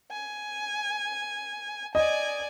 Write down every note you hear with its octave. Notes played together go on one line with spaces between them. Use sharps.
G#5
D5 D#5 G#5